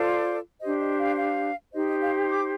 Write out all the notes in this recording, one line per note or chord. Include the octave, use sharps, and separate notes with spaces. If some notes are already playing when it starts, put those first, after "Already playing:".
Already playing: F4 A4 C5 D5
D4 G4 C5 D#5
D#5
F5
F5
D#4 G4 C5 D#5
D#5
F5
D6